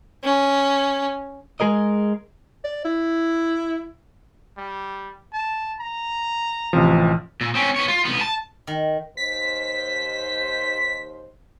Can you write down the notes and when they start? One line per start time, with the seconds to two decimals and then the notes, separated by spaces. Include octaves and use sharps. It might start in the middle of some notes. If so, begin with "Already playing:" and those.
0.23 C#4
1.60 G#3 G#4 A#4 D#5
2.64 D5
2.85 E4
4.58 G3
5.33 A5
5.80 A#5
6.73 A1 C3 F3
7.41 A#2
7.55 C4 C#4
7.76 B3 C#5
7.88 F4
8.05 C2 B3
8.21 A5
8.67 D#3
9.17 D#2 C5 B6